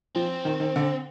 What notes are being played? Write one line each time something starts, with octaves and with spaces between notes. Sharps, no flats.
F3 C4
D#3
D#3
D3